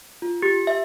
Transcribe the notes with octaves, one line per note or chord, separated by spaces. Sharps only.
F4
G4
E5